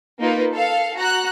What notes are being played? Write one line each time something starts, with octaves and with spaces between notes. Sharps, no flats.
A#3 D#4 F4 B4
A4 F5
F#4 A#5 F#6